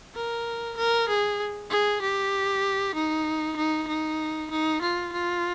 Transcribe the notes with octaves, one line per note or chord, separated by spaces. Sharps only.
A#4
A#4
G#4
G#4
G4
D#4
D#4
D#4
D#4
F4
F4